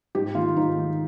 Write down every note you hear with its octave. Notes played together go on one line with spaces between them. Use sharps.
G#2 G4
D#3 F4
G#2 D#4
D#3